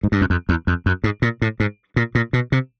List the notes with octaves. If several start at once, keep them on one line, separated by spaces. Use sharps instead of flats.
G#2
G2
F#2
F2
E2
F2
F#2
G#2
A#2
A2
G#2
A#2
A#2
B2
C3